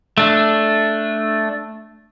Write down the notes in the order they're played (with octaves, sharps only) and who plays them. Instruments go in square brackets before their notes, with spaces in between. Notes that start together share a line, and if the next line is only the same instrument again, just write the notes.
[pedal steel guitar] A3 D4